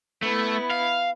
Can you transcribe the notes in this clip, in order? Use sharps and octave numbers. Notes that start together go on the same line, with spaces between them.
A3 B3 E4
F5